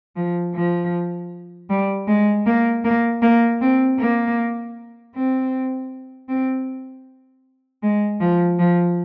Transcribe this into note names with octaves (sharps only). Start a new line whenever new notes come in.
F3
F3
G3
G#3
A#3
A#3
A#3
C4
A#3
C4
C4
G#3
F3
F3